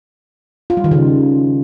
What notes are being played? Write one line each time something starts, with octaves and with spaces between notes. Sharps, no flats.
F4
G3
D#3
C#3